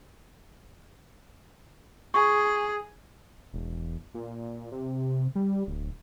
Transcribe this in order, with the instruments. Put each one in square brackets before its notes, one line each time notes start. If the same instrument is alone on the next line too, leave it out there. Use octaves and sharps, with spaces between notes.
[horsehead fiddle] G#4 [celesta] C#6
[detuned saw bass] E1
A#2
C3
G3
D1